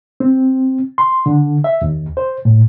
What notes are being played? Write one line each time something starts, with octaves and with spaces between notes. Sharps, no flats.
C4
C6
D3
E5
D#2
C5
A2